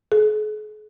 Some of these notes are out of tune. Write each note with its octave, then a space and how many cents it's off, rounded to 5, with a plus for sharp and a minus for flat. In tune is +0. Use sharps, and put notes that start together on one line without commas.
G#4 +45